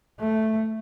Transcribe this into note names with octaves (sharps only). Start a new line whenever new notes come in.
A3